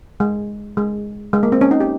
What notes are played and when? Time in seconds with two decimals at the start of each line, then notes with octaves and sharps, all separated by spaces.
0.20 G#3
0.77 G#3
1.33 G#3
1.43 A#3
1.52 C4
1.61 C#4
1.71 D#4
1.80 G4